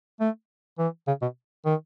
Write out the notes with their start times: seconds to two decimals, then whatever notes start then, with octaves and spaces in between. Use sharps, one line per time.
0.20 A3
0.78 E3
1.07 C#3
1.22 B2
1.65 D#3